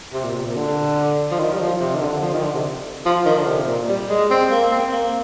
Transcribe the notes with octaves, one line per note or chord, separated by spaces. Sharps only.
C3
A#2
C3
A#2
D3
F3
D#3
G3
F3
C3
D#3
D3
F3
D#3
D3
C3
F3
D#3
D3
C3
A#2
G3
G#3
C4
A#3
C4
A#3